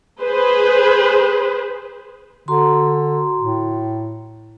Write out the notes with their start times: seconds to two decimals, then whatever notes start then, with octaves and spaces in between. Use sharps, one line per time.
0.21 G#4 B4 C5
2.48 D3 F#4 A#5 C6
3.38 A2